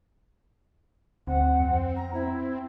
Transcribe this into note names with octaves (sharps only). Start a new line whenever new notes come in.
D2 C4 F#5
F2
A#5
C4 E4